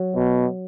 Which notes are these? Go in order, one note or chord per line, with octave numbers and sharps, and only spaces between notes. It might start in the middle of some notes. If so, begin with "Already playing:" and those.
Already playing: F#3
B2